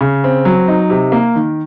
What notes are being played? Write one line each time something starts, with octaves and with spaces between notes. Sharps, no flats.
C#3
C4
F#3
D#4
C3
A#3
D#3